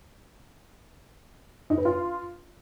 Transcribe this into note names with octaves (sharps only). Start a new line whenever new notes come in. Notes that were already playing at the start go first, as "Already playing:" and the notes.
D#4
B4
F4